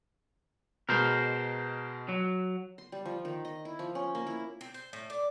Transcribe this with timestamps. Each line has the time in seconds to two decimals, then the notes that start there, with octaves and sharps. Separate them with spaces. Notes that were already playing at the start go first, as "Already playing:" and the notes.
0.89 B2 G#3 A#4 C5
2.09 F#3
2.78 C6
2.92 G3
3.05 F3
3.25 D#3
3.45 D#5
3.65 E4
3.79 F3
3.95 C#4
4.15 A#3
4.27 E4
4.61 C4
4.74 C5
4.93 A2
5.10 D5